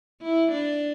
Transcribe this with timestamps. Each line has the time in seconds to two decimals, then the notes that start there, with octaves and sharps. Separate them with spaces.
0.22 E4
0.51 D4